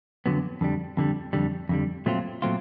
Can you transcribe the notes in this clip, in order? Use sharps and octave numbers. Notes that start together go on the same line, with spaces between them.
F2 D3 F#3 B3
F2 D3 G3
F2 D3 G3
F2 D3 G3
F2 D3 G3
A#2 F#3 A3 C4 F4
A#2 F#3 A3 C4 F4